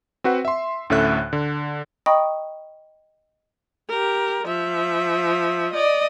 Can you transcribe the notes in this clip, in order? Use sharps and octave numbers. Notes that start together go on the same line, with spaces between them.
C4 F#4 B4 F#5
E5 C6
D2 A2 C#4 A4 E5 F#6
D3
D#5 G5 A#5 B5 C#6 D#6
G4 A#4
F3 E5
D5 D#5